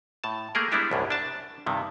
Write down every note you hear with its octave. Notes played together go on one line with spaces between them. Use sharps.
A2 A5
A3 A#3 G#4 A#4
G3 G#3 B3 D4 E4 G4
C2 F#2 A2
D4 A5
G2 C3 D#3